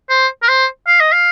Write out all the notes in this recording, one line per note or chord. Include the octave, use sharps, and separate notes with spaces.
C5
A#4
C5
F5
D#5
F5